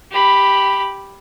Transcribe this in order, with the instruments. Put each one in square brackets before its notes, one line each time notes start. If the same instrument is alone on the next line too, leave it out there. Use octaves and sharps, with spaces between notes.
[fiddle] G4 B5